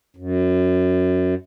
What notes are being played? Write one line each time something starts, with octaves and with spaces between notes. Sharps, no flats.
F#2